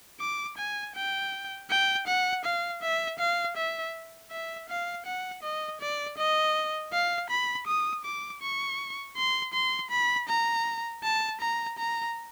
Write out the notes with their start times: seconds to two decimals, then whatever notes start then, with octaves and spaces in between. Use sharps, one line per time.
0.20 D6
0.58 G#5
0.95 G5
1.70 G5
2.07 F#5
2.45 F5
2.82 E5
3.19 F5
3.56 E5
4.31 E5
4.69 F5
5.06 F#5
5.43 D#5
5.81 D5
6.17 D#5
6.92 F5
7.30 B5
7.67 D#6
8.05 D6
8.42 C#6
9.17 C6
9.54 C6
9.91 B5
10.29 A#5
11.03 A5
11.41 A#5
11.78 A#5